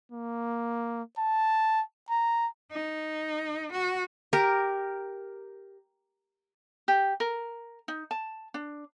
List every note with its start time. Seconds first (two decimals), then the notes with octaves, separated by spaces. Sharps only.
0.12 A#3
1.18 A5
2.10 A#5
2.71 D#4
3.72 F#4
4.33 G4 A#4
6.88 G4
7.20 A#4
7.88 D#4
8.11 A5
8.54 D4